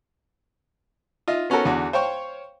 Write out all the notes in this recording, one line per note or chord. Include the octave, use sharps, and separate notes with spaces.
F4 D#5 E5
B3 C#4 F#4 A4 A#4
E2 D3 F#4
C5 C#5 F5 G5 C#6